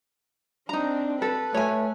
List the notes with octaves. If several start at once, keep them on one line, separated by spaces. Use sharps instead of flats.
C4 D4 D#4 A#5
A4 B4
A3 C#5 G#5